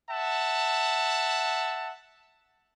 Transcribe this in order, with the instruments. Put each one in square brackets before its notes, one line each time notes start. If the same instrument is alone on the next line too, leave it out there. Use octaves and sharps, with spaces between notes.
[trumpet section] E5 F#5 A5